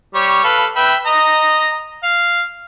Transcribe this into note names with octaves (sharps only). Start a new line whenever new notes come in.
G3 C#5
A4 B4 F5
B4 E5 G5
D#5 A#5
F5